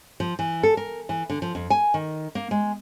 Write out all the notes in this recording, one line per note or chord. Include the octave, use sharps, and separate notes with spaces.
F3
E3
A4
A#4
E3
D3
F3
F2
G#5
D#3
A#3
G#3